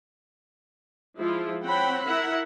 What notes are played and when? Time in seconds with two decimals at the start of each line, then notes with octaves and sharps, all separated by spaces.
1.17 F3 G#3 E4 F4
1.63 C4 C#5 F#5 G5 B5
2.03 E4 A#4 E5 F#5